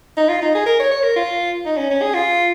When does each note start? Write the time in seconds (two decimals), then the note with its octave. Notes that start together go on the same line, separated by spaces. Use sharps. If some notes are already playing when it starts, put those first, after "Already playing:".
0.17 D#4
0.29 F4
0.42 D#4
0.55 G#4
0.66 A#4
0.80 C#5
0.91 C#5
1.03 A#4
1.16 F4
1.66 D#4
1.77 C#4
1.90 C#4
2.02 G#4
2.14 F4